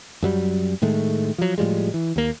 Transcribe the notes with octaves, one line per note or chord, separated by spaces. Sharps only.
F#2 F#3 G3
A2 D#3 G#3 A3
F3 F#3
A2 F3 G3 G#3
E3
D#2 A#3